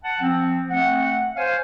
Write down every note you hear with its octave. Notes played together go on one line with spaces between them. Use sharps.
F#5 A5
F3 C4
A3 C4 F#5
C5 C#5 F5 G#5